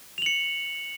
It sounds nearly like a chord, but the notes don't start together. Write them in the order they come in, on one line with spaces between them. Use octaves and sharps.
F7 F#7 C#7